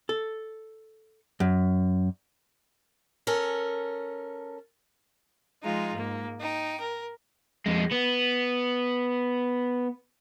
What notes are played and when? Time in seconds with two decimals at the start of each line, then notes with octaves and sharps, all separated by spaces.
0.09 A4
1.40 F#2
3.27 C#4 A4 A#4
5.63 F3 G#3 D#4 F4
5.94 G#2 A#3
6.39 D#4 G5
6.80 A#4
7.66 F2 G#3
7.92 B3